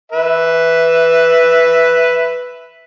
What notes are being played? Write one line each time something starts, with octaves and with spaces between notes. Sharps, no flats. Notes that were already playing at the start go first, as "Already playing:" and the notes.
B4 E5